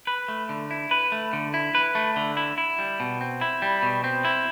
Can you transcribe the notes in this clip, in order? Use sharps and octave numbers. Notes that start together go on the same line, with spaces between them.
B4
A3
D3
E4
B4
A3
D3
E4
B4
A3
D3
E4
E4
G3
B2
C4
E4
G3
B2
C4
E4